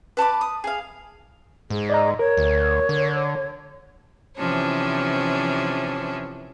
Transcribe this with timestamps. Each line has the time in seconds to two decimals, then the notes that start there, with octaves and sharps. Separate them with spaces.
0.17 B4 A5 B5 D6
0.41 D#6
0.64 G#4 F5
1.70 G#2 G#4
1.90 D5 D#5 A#5
2.19 A#4 C#5
2.37 D2
2.89 D3
4.37 C3 E3 F3 C#4 D4